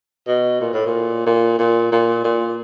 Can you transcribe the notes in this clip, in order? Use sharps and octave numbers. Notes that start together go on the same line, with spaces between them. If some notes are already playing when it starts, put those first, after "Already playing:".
B2
A#2
A2
A#2
A#2
A#2
A#2
A#2